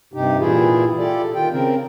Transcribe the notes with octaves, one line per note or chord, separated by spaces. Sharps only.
G2 C3 D#4 G4
A#2 E3 E4 F4 G#4
F4 G4 A4 D5
D#3 F4 G5
C#3 C4 A#4